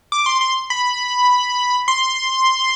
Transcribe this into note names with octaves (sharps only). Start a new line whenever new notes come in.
D6
C6
C6
B5
C6